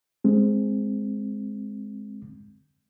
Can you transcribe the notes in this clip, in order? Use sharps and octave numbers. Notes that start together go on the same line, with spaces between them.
G#3 C4